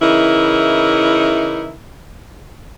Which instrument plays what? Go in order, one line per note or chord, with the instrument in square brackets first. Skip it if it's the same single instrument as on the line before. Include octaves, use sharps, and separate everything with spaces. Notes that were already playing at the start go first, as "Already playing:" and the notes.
[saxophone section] C#3 E3 D#4 E4 A#4